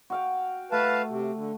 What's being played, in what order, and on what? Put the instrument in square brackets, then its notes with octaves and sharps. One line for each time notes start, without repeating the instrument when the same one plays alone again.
[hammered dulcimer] F#4 F5 G5
[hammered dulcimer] A3 [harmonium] B4 F5 A5
[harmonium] C3
D3